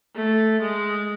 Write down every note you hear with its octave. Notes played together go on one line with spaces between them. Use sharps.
A3
G#3